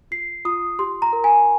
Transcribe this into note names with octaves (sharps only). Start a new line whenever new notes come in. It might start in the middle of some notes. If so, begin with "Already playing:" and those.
F4 C7
F4 D#6
G4 C6
A#5
A#4
G#5